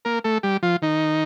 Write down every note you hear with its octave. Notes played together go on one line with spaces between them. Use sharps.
A#3 A#4
A3 A4
G3 G4
F3 F4
D#3 D#4